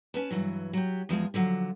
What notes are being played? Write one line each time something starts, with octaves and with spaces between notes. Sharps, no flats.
C#4 B4 A5
G2 E3 F#3
F#3 G4
E2 F3 G#3 G#4
D3 F3 F#3